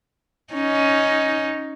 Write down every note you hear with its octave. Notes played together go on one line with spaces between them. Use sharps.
C#4 D#4